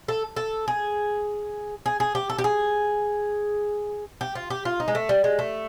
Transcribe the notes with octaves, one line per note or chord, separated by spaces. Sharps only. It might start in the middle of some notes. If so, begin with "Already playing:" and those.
A4
A4
G#4
G#4
G#4
G4
A4
G4
G#4
G4
F4
G4
F4
D#4
G#3
A3
G3
G#3
A3